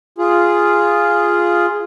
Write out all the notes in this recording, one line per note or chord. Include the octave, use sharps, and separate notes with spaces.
F4 G#4